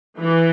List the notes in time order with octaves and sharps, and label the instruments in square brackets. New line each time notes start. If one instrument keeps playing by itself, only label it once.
[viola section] E3